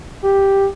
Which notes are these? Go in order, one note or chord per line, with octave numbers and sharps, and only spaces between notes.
G4